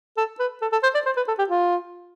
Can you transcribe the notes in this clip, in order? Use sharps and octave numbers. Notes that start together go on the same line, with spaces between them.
A4
B4
A4
A4
C5
D5
C5
B4
A4
G4
F4